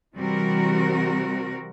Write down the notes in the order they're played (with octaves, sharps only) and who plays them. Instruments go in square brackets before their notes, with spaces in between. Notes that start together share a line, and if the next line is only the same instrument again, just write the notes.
[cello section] C3 E3 G3 C4 F#4 A#4